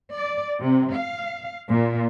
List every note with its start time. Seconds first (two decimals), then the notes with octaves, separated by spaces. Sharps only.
0.13 D5
0.59 C3
0.92 F5
1.69 A#2